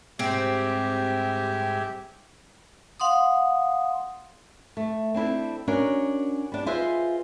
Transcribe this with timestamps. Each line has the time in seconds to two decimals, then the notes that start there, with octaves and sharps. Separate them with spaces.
0.19 G#2 G3 C4 G4 G#4 E5
3.00 F5 F#5 C6 D#6
4.77 A3
5.14 C4 D4 E4 A4
5.68 C#4 D4 F#4 A#4
6.52 G3 D4
6.66 F4 G#4 B4 C5 D#5 E5